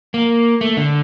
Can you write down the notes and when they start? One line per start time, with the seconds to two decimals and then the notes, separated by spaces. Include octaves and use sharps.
0.14 A#3
0.61 A3
0.77 D3